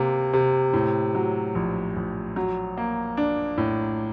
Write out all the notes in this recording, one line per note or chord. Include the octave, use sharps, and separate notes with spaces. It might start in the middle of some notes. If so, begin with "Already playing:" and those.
Already playing: C3 A#3
C3
A2
F#3
A#1
A#1
F#3
A#3
D4
A2